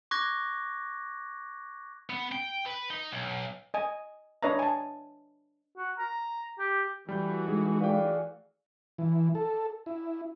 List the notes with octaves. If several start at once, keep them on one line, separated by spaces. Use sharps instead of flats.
C#6 D6 F#6 G#6 A#6
B3
G5
B4
D#4
B1
D#5 G#5
D4 B4 C#5 D#5 E5 A#5
G#5 A5
F#4
A#5
G4
E3 G3 A3 F#4 B5 G6
G#3 D#4 G#4
G#4 B4 D5 F5 G5
E3
A4
E4